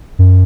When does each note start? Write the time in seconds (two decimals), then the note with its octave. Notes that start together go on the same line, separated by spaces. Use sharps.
0.19 F#2